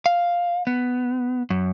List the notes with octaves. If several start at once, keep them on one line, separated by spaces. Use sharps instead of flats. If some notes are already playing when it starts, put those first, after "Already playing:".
F5
B3
F#2